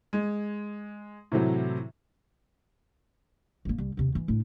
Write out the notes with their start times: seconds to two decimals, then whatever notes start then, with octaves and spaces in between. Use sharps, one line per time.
0.13 G#3
1.32 A2 C3 E3 F#3
3.65 G#1 A#3
3.78 C2
3.97 D#2 C3
4.15 E3
4.28 A2 D4